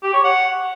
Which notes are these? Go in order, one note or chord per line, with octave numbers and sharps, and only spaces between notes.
G4
C#5
F#5